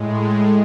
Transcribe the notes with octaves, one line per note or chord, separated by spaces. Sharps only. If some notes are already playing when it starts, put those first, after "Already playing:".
Already playing: A2 G#3